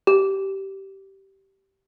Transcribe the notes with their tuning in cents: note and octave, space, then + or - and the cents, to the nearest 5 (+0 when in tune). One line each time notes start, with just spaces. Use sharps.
G4 -15